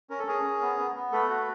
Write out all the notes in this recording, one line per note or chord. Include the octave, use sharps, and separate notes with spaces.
C#4 A#4
A4
C#4 G#4 A#4
C#4
B3
B3
B3
A3 A4 B4
F#4